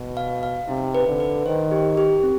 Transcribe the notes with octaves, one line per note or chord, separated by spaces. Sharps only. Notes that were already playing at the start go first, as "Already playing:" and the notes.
Already playing: B2
F5
F5
C3 D#4
B4
D3
B4
D#3 C5
G4
G4
C4